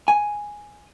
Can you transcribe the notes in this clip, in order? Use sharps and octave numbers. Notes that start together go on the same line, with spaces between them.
G#5